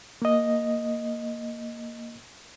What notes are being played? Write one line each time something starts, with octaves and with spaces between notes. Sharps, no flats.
A#3 D#5